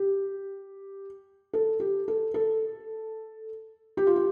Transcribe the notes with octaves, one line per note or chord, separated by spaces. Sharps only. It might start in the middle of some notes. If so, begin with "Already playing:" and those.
Already playing: G4
A4
G4
A4
A4
G4
F4
G4